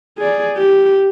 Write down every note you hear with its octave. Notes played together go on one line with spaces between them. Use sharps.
G#4 D5
G4